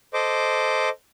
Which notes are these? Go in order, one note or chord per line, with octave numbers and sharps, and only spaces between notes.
A4 C5 D#5 D6